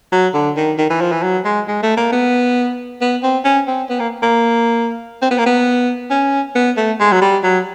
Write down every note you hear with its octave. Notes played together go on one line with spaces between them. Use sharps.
F#3
D3
D#3
D#3
E3
F3
E3
F#3
G#3
G#3
A3
A#3
B3
B3
C4
C#4
C4
B3
A#3
A#3
C4
B3
A#3
B3
C#4
B3
A3
G#3
F#3
G3
F#3